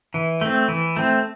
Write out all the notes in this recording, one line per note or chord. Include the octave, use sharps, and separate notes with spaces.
E3
A3 C4
E3
A3 C4